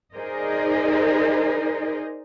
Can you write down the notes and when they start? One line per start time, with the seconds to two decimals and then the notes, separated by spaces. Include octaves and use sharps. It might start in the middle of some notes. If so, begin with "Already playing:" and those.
0.14 D#4 G#4 A#4 C5 D5 D#5